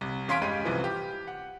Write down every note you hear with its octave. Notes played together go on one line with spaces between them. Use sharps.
C2
E2 C#4 F5 C6 B6 D7
G2 G3 G#3 C#4 G#6 D#7
C2 E3 F3
G4
F#5